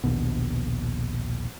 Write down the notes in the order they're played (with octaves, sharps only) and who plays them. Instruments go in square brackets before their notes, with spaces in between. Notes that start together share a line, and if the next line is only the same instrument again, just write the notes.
[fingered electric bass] A#1 D#2 B2